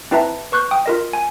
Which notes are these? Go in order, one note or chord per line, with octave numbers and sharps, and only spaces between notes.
C4 E4 B4 E5 A5 A#5
B4 C#6 F#6 G6
G5 D#6
F4 A#4 D#5
G#5